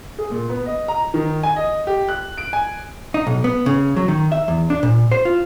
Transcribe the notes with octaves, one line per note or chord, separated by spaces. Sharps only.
G#4
A#2
B3
D#5
A#5
D#3
G#5
D#5
G4
F#6
D7
G#5
D#4
B1
B3
C#3
F#3
D#3
E5
E2
D4
A#2
C5
F4